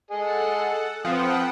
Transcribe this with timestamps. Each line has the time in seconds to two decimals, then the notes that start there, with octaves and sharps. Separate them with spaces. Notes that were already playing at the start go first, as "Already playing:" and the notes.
0.11 G#4 A4 D#5 F#5
1.05 F3 C4 B4 F#5 G5 D#6